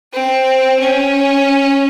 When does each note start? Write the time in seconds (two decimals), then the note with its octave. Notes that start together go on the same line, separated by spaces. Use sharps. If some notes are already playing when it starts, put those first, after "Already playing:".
0.13 C4
0.80 C#4